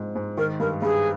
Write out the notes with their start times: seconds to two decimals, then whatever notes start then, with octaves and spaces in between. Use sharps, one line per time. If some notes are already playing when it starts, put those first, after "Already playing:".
Already playing: G#2 F3 C4
0.16 G#2
0.37 D#3 A#4
0.60 G2 A#4
0.82 G2 G#4